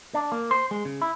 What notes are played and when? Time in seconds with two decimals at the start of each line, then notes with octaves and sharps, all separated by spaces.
0.14 D4
0.32 A#3
0.51 C5
0.71 G#3
0.85 C#3
1.02 E4